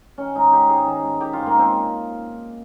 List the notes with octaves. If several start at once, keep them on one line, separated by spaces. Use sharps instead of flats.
D#3 C#4
G#2 D#4
D#3 G4
G#2 G#4
D#3
G#2
D#3 G4
G#2 F4
A#3
D#3 C4